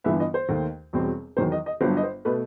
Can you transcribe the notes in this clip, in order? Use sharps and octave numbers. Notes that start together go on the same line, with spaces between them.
G1 G2 E3 B3 E5
D#5
C5
D#2 D#3 A3
E1 E2 B2 G3 C4
E2 D#3 F#3 C5
D#5
D#5
G1 G2 F#3 B3 C5
D#5
C5
B2 A3 B4